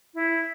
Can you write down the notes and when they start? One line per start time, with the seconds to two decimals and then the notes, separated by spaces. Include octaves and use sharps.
0.15 E4